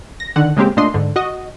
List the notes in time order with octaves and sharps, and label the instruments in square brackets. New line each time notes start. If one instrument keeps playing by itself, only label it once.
[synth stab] A#6
D3 D#3 F#5
C#3 G#3 A#3 C4 G4
A#2 A3 D4 D#5 C6
G#2 D3
F#4 D#5